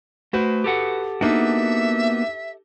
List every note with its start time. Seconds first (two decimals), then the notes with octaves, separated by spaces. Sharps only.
0.33 A3 F#4 B4 C5
0.64 G4 A4 F#5
1.21 A#3 B3 D4 D#4 F#4 E5